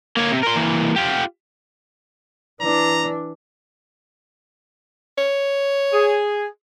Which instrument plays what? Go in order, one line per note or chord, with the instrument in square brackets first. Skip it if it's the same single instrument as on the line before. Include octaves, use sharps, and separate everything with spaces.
[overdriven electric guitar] A#3 C#5
C3
A#4 C6
E3 A#3
F4 G4
[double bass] E3 D4 [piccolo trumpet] A#5
[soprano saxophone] C#5
[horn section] G#4